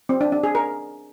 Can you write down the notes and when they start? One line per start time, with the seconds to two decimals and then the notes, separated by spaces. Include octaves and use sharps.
0.09 C4
0.21 D4
0.32 D4
0.43 G#4
0.55 A#4